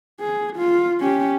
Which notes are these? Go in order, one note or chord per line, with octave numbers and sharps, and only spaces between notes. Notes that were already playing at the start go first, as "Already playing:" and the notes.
G#4
F4
C#4 G4